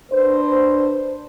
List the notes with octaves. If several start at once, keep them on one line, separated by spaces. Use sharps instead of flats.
D4 B4 C5